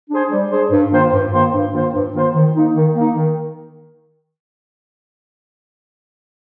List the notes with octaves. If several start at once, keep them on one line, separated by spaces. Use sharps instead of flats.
D4 G#4 C5
G3
D4 G#4 C5
G2
D#3 A#3 F4 C5
G2
D#3 A#3 F4 C5
G2
D#3 A#3 F4 C5
G2
D#3 A#3 F4 C5
D#3
A#3 D#4
D#3
A#3 D#4
D#3